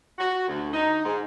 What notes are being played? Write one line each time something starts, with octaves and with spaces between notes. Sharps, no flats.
F#4
D2
D#4
G#2